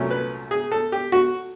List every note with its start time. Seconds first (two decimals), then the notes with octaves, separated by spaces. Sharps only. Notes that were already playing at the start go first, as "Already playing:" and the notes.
Already playing: C2 A#2 F#3 A3 C#4
0.11 B4
0.51 G#4
0.72 A4
0.92 G4
1.12 F#4